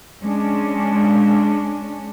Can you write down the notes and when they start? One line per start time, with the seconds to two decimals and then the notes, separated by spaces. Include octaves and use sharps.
0.23 G#3 C#4 D4